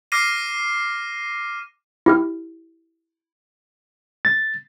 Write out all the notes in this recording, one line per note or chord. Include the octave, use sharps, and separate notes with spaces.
D6 F6 A#6 C7 D#7
E4 G4 F6
A6